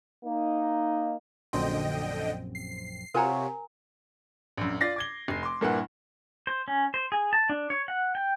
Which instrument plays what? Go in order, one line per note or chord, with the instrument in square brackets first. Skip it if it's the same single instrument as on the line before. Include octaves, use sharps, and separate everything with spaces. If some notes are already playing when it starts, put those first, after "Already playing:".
[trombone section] A#3 D#4
[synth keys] A#1 F#2 C4 [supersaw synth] D3 D#5 G5 [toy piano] C6
[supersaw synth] C7
[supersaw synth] C3 [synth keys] F4 F#4 C#5 [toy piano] A#4 G#5 A#5
[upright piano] A#1 F#2
F4 D5 A6 A#6 C7
D6 G#6 G7
F1 C7
C6 D6
G2 A#2 A#3 E4 B4 F#5
[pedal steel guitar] C5
C#4
C5
G#4
A5
D4
C#5
F#5
G5